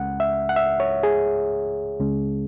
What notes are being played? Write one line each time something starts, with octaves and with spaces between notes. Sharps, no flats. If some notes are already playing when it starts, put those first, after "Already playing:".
Already playing: C#2 C#3 G#3 C#4 F#5
E5
F#5
E5
C#5
G#4
C#2 C#3 G#3 C#4